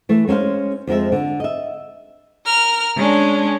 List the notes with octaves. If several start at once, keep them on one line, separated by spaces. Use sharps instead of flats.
E3 A3
G#3 C#4 A4 C5 F5
F2 F3 G#3 E5
D3
D#5 E5
A#4 F6
G#3 C#4 D4